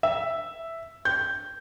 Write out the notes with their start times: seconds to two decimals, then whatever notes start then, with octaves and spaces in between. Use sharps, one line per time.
0.03 E5
1.05 G6